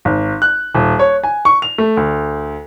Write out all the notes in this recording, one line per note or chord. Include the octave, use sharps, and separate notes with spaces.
G#1
F#6
D#1
C#5
G#5
C#6
F7
A3
D2